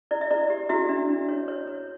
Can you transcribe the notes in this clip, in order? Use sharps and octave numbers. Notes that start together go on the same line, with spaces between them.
E4 D5
E5
E4 D5
G4
E4 F#4 E5
D4
D4
C#5
C#5
C#5